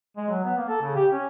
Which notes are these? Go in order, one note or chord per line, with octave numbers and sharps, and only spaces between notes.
G#3
F#3
B3
A#3
A4
C#3
G4
C#4